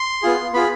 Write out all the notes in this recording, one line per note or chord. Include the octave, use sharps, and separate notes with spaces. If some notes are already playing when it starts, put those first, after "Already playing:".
Already playing: C6
B3 F4 G#4
B3 F4 G#4 B5